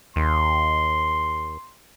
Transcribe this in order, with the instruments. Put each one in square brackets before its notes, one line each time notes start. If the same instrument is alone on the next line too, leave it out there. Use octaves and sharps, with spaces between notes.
[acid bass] D#2 [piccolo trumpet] C6